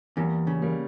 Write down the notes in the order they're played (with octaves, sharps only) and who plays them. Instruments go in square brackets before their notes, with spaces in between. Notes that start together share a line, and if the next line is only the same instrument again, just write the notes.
[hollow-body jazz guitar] E2 [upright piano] G3 A#3
[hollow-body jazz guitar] C#3
[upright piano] G3 A#3